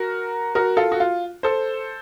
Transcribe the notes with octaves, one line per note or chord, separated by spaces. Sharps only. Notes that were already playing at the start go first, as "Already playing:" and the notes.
Already playing: F#4 A#4
F#4 A#4
F4 A4
F#4
F4
A4 C5